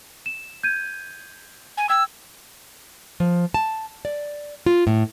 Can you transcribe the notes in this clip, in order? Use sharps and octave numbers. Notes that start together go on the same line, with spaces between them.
E7
G6 G#6 D#7
G#5
G5 E6 G#6
F3
A5
D5
F4
A2